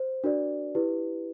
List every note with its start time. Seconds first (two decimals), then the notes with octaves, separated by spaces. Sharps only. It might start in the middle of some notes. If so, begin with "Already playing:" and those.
Already playing: C5
0.24 D4 F#4 A#4 D5
0.75 E4 G4 B4